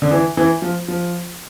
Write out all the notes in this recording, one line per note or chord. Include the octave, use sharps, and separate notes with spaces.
D3
E3
E3
F3
F3